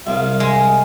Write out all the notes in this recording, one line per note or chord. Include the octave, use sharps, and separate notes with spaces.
C2 F5
G#3